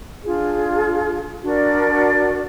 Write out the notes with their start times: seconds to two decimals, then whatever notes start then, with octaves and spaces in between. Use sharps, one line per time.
0.24 D4 F4 G#4
1.43 D4 F#4 A#4 D5